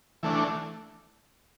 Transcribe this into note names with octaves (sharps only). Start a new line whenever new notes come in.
E3 A3 D4